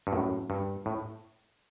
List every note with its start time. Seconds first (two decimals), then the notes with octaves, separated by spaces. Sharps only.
0.07 G2
0.13 F#2 A2
0.50 G2
0.86 A2